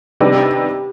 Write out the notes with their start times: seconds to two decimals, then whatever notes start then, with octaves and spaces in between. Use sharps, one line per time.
0.20 C3 D#3 G3 B3 D4 G4